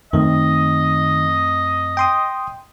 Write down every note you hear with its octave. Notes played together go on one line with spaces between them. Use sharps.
F#2 D#3 A3 C4 D#5
G5 C6 D#6